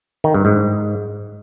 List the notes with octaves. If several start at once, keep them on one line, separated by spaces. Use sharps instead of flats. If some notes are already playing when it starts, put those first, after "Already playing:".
D#3
G2
G#2